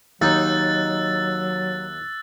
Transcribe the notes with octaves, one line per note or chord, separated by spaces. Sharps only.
D#2 F#3 D#4 E6 F#6 A6